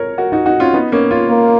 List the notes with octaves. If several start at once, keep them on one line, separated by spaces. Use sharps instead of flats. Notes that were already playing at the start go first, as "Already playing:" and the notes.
Already playing: A#4 C#5
F#4 A#4
D#4 F#4
D#4 F#4
C#4 F4
B3 D#4
A#3 C#4
C#4 F4
A#3